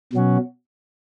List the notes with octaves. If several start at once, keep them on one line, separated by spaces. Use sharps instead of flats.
B2 F#3 C#4 F#4